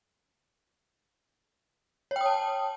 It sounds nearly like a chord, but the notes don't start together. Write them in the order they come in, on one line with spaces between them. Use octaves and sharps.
C#5 G5 D#6 A5